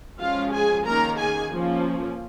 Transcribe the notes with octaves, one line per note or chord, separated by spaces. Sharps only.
F3 G#3 C#4 F4 F5
G#4 G#5
D#3 A#3 C#4 A#4 A#5
G#4 G#5
F3 A#3 C#4